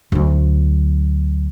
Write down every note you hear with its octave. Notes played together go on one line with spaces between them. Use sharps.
D2 F#3